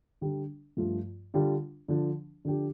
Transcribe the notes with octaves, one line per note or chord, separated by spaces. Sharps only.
D3 G3 D4
G2 F3 A3 F4
D3 G3 D4 F4
D3 F3 D4
D3 F3 D4 G4